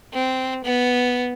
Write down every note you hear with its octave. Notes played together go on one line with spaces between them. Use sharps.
C4
B3